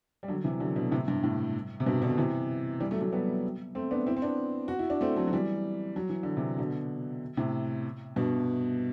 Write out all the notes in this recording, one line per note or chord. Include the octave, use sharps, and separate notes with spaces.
G3
D3 F#3
C3 E3
D3 F#3
B2 D3
A2 C3
G2
A2
C3
G2 B2
B2 D3
C3 E3
E3 G3
F#3 A3
F#3 A3
G3 B3
A3 C4
B3 D4
C4 E4
C4
B3 D4
F#4
E4
D4
A3 C4
F#3 A3
F#3
E3 G3
F#3
E3
D3
C3 E3
B2 D3
A2 C3
G2 B2